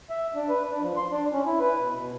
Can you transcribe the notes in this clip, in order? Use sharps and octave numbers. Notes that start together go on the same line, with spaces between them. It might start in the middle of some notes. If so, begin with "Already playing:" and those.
E5
D4
B4
D4
F3
C6
D4
C#4
E4
B4
B2
B2